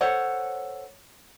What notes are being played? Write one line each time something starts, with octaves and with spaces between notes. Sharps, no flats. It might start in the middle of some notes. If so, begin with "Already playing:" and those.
A4 C5 C#5 F#5